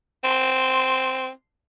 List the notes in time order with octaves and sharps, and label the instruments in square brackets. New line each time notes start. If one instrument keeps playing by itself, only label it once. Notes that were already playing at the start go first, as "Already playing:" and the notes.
[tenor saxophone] C4 [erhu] C6